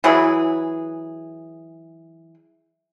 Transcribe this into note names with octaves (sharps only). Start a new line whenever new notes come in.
E3 F#3 G#4 B4